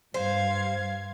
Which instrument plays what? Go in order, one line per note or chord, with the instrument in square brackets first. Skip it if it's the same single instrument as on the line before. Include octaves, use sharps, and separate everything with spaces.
[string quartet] G2 F5 G#6 [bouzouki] C5